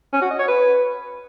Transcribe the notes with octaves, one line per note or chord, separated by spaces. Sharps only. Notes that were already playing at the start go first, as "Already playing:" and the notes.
C#4
F#4
D#5
C#5
B4